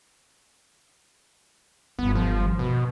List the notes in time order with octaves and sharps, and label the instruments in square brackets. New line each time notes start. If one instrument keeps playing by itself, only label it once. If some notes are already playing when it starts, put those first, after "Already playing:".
[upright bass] D1 G1 [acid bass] B3
[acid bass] F3
[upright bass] D#2
[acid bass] B2